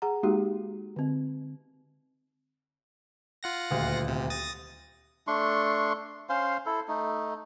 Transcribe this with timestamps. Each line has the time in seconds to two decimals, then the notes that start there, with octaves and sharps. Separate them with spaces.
0.02 G#4 F#5 A#5
0.23 G#3 A#3 D#4 F#4 G4
0.96 D3 C4
3.43 F4 F#5 A#6
3.71 D#1 D2 F5
4.08 C3
4.30 D#6 A6 A#6
5.27 A3 D4 C6 C#6
6.29 C#4 C5 F5 C6
6.66 E4 A4
6.88 A3 D#4